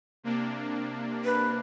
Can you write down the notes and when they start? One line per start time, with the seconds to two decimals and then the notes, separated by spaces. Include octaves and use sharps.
0.23 C3 A#3 D4
1.25 B4